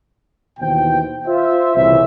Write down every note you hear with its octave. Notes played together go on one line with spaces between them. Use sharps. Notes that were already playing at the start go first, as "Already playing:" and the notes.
D#2 B2 E3 C5 G5
F4 C5 E5
C2 F2 A#2 C#3 E3 E5